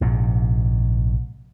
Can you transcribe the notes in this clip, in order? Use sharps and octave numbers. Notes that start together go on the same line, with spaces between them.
A#1 G#2 C3